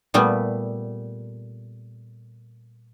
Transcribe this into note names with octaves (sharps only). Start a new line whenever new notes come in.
A#2 G3 A3 B3